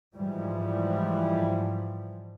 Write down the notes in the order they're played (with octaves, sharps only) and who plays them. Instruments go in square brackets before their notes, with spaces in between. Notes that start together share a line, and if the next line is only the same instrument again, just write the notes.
[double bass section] G#2 E3 F3 G3